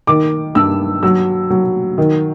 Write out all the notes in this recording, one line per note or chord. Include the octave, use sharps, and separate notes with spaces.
D#3 D6
G2 E6
F#3 E6
F#3
D#3